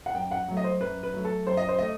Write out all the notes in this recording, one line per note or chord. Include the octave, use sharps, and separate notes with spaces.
F#5
F#2 G5
F#5
F#3 A3
D#5
C5
F#2 B4
B4
F#3 A3
A4
F#2 C5
D#5
C5
A3 D#5